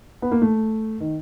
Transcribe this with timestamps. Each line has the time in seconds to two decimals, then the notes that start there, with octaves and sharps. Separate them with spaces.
0.22 B3
0.32 A#3
0.42 A3
1.00 D#3